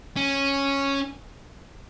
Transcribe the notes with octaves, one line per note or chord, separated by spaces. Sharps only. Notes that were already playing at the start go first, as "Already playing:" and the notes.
C#4